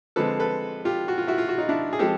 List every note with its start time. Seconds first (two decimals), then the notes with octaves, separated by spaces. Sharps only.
0.16 D3 F3 G#3 C4 A4 B4
0.40 A4 B4
0.85 F4 G4
1.08 F#4
1.18 F4
1.27 E4 F#4
1.38 F4
1.49 F#4
1.58 D#4 F4
1.69 D4 E4
1.93 G#4
1.99 F3 G#3 C4 G4 A4